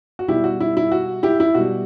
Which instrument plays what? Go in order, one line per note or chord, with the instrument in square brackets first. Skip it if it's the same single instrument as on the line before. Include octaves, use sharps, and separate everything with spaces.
[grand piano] F#4
B2 G3 E4 G4
F#4
E4
E4
F#4
E4 G4
E4
B2 G3 F#4